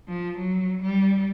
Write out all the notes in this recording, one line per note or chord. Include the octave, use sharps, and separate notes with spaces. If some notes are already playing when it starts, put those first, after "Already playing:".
F3
F#3
G3